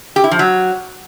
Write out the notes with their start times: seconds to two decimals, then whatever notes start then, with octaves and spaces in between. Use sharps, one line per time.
0.16 G4
0.24 E4
0.31 F3
0.39 F#3